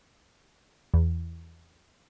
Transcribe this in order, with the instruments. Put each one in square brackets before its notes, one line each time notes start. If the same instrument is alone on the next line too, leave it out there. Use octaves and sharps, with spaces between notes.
[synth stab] E2